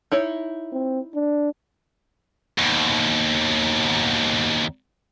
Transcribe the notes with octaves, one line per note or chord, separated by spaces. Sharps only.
D#4 E4 C#5
C4
D4
D#2 B2